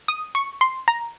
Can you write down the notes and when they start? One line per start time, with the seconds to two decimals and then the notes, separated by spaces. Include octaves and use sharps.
0.08 D#6
0.35 C#6
0.61 C6
0.88 A#5